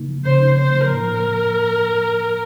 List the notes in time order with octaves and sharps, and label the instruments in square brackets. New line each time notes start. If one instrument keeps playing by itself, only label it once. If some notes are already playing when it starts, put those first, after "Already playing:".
Already playing: [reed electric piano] C#3 A#3 D#4
F3
[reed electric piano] C#3 [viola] C5
[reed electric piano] D#4
[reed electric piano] A#3 [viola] C5
[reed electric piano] F3
[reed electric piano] A2 [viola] A#4
[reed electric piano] A#3